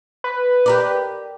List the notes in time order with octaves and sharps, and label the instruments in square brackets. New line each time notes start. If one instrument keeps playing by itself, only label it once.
[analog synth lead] B4
[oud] G4 A#4 D5